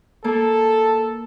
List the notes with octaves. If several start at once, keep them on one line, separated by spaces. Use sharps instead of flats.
A#3 A4